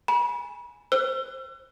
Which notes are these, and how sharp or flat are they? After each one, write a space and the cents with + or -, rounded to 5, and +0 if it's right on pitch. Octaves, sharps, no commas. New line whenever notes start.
G#5 +0 B5 -40
C5 +5 E6 +40